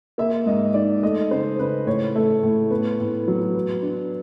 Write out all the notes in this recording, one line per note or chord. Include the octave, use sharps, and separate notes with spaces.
A#3 E5
G#2 D#5
D#4 D5
A3 D#5
C#3 C5
C#3 B4
A2 C#5
A3
A2
B3
A2
F#3
B3
D4